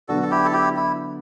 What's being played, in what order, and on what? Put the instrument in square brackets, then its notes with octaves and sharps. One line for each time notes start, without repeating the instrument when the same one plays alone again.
[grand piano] D3 F#3 B3 D4 [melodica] F#4 A4
[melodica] A4
E4 G4
A4
E4 G4
E4